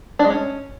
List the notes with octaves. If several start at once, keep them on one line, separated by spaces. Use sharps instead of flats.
D4
G#3
C#4